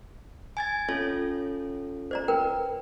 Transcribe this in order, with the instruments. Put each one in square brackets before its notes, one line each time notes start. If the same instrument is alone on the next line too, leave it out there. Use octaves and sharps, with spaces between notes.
[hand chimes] G#5 G#6 A6
[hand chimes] C#4 F4 A4 [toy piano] C#5
[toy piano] C5 D5 A#5
A#4 B4 G5